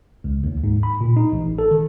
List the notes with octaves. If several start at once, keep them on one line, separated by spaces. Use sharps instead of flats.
C#2
D#2
G#2
B5
A#2
D#4
A1
A4
D#3